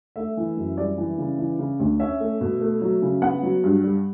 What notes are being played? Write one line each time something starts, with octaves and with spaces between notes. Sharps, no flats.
A3 E5
E3
F#2
G3 D5
E3
C#3
E3
C#3
D2
C#4 E5
A3
B2
A3
F#3
C#3
B3 F#5
F#3
G2
G3